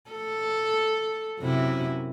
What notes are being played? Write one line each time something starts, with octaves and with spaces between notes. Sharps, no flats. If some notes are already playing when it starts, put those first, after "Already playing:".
A4
F#2 C3 E4